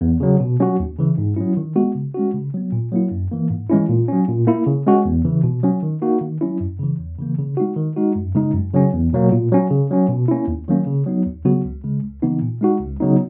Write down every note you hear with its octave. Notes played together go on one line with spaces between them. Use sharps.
E2
C#3 F#3
B2
F#3 C#4 F#4
D#2
C#3 E3
G#2
F#3 C#4 E4
D#3
G#3 B3 F#4
C#3
G#3 C#4 F#4
C#3
F#3 B3
A#2
F#3 A#3 E4
F#2
E3 A#3
G#2
E3 G#3 C#4 E4
A#2
F#3 C#4
A#2
A#3 E4
C#3
G#3 C#4 F#4
E2
C#3 E3
B2
F#3 C#4
D#3
A#3 D#4 F#4
D#3
F#3 C#4 E4
F#2
C#3 E3
E2
C#3 E3 A#3
C#3
G#3 D#4 F#4
D#3
G#3 D#4 F#4
F#2
C#3 G#3 D#4
F#2
C#3 F#3 C#4
E2
B2 F#3 A#3
A#2
F#3 C#4
C#3
F#3 C#4
B2
A#3 C#4 E4
D#2
D#3 F#3 A#3 C#4
C#3
F#3 B3 D#4
D#2
C#3 F#3 B3 F#4
C#2
C#3 G#3
C#2
C#3 E3 B3 D#4
A#2
G#3 D#4 F#4
C#2
C#3 F#3 B3 D#4